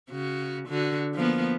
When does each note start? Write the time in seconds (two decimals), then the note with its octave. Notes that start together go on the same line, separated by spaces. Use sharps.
0.11 C#3 F#4
0.68 D3 F#4
1.15 F3 A#3 B3